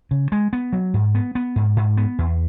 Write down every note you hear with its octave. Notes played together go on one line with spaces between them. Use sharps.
C#3
G#3
B3
F#3
G#2
B3
B3
G#2
G#2
B3
E2